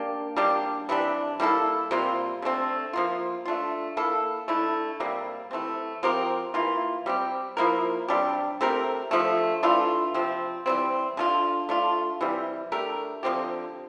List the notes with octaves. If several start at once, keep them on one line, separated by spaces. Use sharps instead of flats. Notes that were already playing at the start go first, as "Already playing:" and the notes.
Already playing: A#3 D4 G4
G3 A#3 D4 G4
C3 E3 G3 D4
G3 A#3 E4 A4
C3 G3 A#3 F4
D3 A3 C4
F3 A#3 F4
A3 D4 F4
A#3 E4 A4
D3 A3 E4
C3 G3 A#3
E3 A3 C4
F3 C4 G4 A#4
E3 A#3 F4
G3 C4 G4
F3 A#3 E4 A#4
C3 G3 D4 G4
A3 C4 G4 A#4
D3 F3 A3
E3 A3 D4 F4
C3 F3 C4
E3 G3 C4
D3 A3 D4 F4
A3 D4 F4
C3 E3 G3
A3 D4 G4 A#4
D3 F3 C4 G4